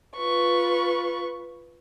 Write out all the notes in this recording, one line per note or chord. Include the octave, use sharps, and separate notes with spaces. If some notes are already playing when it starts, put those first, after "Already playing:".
F4 B4 C#6